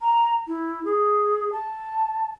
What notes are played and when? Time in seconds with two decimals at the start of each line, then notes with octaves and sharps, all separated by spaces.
0.01 A#5
0.48 E4
0.85 G#4
1.52 A5